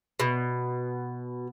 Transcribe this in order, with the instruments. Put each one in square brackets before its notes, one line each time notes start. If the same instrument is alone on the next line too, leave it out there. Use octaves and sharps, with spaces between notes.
[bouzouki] B2